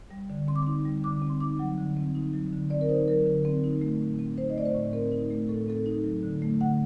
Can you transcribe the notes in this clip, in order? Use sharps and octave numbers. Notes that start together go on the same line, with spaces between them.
G3
D3
C4 C6
D6
D#4 C6
G3
D3 D6
C4
C6
D#4 D6
F#3 F#5
D3
C4
D#4
F#3
D3
C4 D5
A#4
D#4 C5
F#3 A#4
D3
C4
D#4
A3
A2
C4
D#4 C5
D#5
A3 D5
C5
A2
C4 A#4
D#4
A3
A2 A4
C4 A4
D#4
F#3
D3
A3
D3 F#5